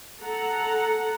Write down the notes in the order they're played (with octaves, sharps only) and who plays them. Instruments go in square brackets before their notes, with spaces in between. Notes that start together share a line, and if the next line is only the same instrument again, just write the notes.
[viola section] A4 F#5 A#5